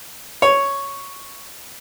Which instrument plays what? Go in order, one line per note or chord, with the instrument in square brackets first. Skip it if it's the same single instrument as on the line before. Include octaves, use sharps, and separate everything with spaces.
[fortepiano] C#5